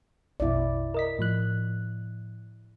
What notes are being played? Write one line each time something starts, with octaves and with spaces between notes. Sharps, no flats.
A#1 F2 B2 E4 D5
A#4 D#5 B6
A2 F3 F#6